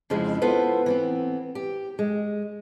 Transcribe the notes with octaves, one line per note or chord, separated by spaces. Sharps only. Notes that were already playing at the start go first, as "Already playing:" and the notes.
F2 C#3 F3 G#3 C4 E4
B3 E4 F4 A4 B4 C5
E3 B3 C4
G4
G#3